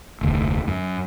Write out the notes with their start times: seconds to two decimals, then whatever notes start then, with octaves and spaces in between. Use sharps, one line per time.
0.21 F1 D2
0.68 F#2